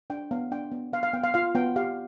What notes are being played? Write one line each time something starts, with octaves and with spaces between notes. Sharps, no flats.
D4 G5
B3 F5
D4 G5
B3
B3 F5
F5
B3 G5
F5
F4 F5
B3 G5
G4 F5